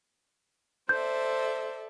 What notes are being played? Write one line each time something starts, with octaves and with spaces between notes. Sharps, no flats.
A4 C5 D5 E5 G6